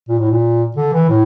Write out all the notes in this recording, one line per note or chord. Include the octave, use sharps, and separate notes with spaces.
A#2
A2
A#2
D3
E3
A2